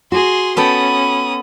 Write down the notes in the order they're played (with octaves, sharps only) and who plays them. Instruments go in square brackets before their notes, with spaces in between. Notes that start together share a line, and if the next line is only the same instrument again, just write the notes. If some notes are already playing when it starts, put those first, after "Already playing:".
[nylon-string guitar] F#4 [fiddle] G#4 C6
[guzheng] B3 A4 G5 [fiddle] C#4 D#6 [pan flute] B5